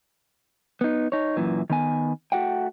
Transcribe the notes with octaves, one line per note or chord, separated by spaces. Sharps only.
B3 D#4
D#4 C#5
F#2 A#2 E3
D#3 B3 G#5
A3 F#4 F#5 G5